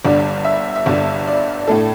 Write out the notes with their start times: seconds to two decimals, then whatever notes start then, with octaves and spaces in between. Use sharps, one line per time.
0.04 G1 G2 D3 G3 D5
0.45 E5
0.76 E5
0.86 G1 G2 D3 G3 D5
1.27 D5
1.68 A2 A3 D4 A4